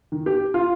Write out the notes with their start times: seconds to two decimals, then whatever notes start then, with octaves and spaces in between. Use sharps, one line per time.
0.12 D#3
0.26 G4
0.54 F4